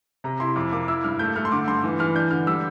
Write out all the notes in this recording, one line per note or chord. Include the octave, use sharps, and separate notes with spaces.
C3 A#5
E4 C6
F2 D6
A#3 D6
E4 E6
G2 F6
A3 G6
A3 F6
C6
D3 D6
G2 C6
E3
E3 F6
D4 G6
D3 F6
G3 E6